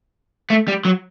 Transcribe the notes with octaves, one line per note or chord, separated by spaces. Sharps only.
A3
G3
F#3